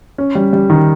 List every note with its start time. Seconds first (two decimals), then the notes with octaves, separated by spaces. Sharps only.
0.18 C#4
0.35 G3
0.53 G3
0.70 D#3